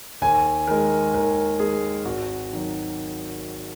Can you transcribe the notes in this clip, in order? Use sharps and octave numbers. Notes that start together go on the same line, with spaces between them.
D#2 G#5
D#3 G#3 A#4
D#2 A#4
D#3 G#3 G#4
G#1 F#4
D#3 F#3